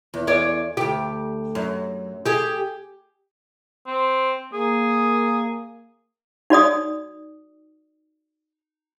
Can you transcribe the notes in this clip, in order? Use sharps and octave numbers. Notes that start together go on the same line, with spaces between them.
E2
E2 C#5 D5
D2 G4
F#2
G4 G#4
C4
A#3 G#4
D#4 F#4 D5 D#6